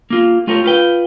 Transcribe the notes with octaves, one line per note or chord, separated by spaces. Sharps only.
A#3 F4 G4
A3 F4 G4 A#4 C#5
F4 B4 G5